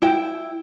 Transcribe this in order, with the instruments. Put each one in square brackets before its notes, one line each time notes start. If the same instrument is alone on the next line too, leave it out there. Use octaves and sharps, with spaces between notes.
[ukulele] E4 G5